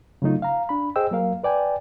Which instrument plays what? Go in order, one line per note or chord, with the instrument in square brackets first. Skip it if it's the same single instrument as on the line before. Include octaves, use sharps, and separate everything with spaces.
[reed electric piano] C#3 F#3 A3 D#4 F4
F5 A#5
D4 B5
G#4 C5 D#5 G5 E6
F#3 A#3 A#4 F5
B4 D5 G5 G#5